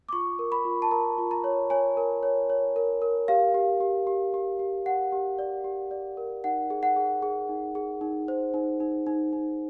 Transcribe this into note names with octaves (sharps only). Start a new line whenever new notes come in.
D6
F4 C#6
A#4
B5
F4
A5
A#4 A#5
F4
A#5
C#5
C#5 G#5
A#4
C#5
C#5
A#4
A#4
G4 F5
G4
G4
G4
G4
G4
G4 F#5
G4
D5
G4
D5
A#4
D#4 F#5
G#4
F#5
G#4
G#4
D#4
G#4
D#4
C5
D#4
D#4
D#4
D#4